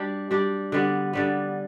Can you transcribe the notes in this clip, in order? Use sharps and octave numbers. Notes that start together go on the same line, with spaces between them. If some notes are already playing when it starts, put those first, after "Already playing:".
Already playing: G3 D4 G4
G3 D4 G4
D3 G3 B3
D3 G3 B3